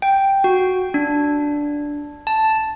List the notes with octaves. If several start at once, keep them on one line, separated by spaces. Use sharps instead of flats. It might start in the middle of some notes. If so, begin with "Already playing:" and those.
G5
F#4
D4
A5